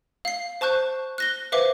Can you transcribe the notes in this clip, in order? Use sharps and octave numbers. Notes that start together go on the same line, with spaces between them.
F5 C7
C5 A5 C#6 F#6 G6
F#6 A#6 G7
B4 C5 E5 F5 D6